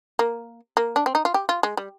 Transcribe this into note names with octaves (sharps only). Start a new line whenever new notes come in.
A#3
A#3
D4
C4
D#4
F4
G4
F4
G#3
G3